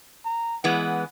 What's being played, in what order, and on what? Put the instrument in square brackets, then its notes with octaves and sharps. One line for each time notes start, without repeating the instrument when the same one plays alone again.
[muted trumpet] A#5
[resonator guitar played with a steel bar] E3 G#3 B3 [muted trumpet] F#5